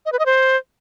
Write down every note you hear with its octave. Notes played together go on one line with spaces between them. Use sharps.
D#5
B4
D#5
C5